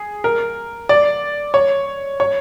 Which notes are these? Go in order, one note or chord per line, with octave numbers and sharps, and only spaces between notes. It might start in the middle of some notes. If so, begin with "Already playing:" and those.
Already playing: G#4
A#4
D5
C#5
C#5